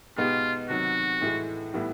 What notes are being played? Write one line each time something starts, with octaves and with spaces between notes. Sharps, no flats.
B2 G#3 B3 D#4 F4 G4
C3 D#3 F#3 F#4
A2 E3 G#3
A2 E3 G3 B3 E4